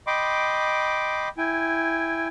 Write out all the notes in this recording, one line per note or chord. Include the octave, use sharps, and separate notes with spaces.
D#5 G5 B5 C6 D6
E4 G5 G#5